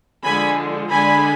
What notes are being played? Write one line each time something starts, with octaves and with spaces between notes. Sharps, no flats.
D3 F3 G#3 G#5 B5
D3 G#3 D4 G#5 B5